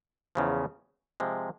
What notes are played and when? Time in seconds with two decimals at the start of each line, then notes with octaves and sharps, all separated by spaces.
0.35 E2 C#3 F3
1.20 C3 F3 G#3